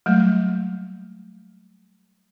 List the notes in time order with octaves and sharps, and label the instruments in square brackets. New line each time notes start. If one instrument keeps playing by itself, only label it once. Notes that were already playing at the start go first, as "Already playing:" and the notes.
[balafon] F#3 G3 A3 A#3